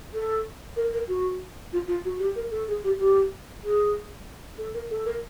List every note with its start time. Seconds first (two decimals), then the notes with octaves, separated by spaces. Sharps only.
0.14 A4
0.76 A#4
0.93 A#4
1.08 F#4
1.73 F4
1.87 F4
2.04 F#4
2.19 G4
2.35 A#4
2.51 A4
2.68 G#4
2.84 G4
2.99 G4
3.63 G#4
4.58 A4
4.74 A#4
4.91 A4
5.05 A#4